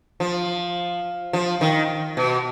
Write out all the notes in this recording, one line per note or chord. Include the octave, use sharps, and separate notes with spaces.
F3
F3
D#3
B2